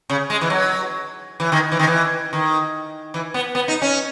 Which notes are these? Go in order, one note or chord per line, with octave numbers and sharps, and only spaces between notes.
C#3
G#3
E3
F#3
E3
D#3
E3
D#3
E3
D#3
E3
B3
B3
D#4
C#4